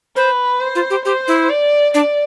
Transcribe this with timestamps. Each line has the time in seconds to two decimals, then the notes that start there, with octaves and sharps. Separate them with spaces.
0.16 B4 C5
0.60 C5
0.75 F4
0.90 G4
1.05 G4 C5
1.28 E4
1.50 D5
1.94 D4 D5